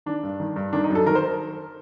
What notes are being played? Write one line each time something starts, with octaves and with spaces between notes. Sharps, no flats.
D#3 D4
G2
D#3
G2
D#3 D4
D#4
F#2
A4
D#3 A#4
C5